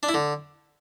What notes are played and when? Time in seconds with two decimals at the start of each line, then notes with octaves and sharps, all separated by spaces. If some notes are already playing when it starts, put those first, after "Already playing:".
0.03 D4
0.09 E4
0.14 D3